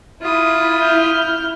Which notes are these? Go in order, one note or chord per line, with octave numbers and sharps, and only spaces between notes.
E4 F4 D#6
F6 G6